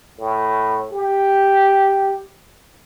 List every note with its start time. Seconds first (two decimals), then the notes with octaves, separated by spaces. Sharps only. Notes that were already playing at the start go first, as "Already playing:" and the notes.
0.19 A2
0.92 G4